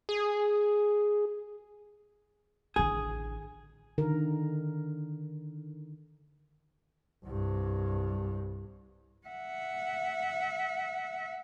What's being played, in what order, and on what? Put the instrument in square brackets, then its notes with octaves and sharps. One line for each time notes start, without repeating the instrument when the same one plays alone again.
[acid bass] G#4
[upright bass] A1 D3 [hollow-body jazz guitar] G#4
[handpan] D3 D#3 A#4
[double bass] C2 G2
[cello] E5 F#5